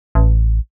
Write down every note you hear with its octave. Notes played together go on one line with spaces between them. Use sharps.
A1